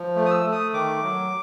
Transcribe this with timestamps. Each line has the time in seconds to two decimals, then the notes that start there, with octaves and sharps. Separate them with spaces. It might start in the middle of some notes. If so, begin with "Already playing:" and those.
Already playing: F3
0.16 A3
0.26 D#6
0.31 E6
0.45 A3
0.52 D#6
0.73 D#3 D6
1.03 F#3